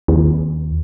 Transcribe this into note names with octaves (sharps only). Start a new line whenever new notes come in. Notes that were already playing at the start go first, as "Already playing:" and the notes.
D#2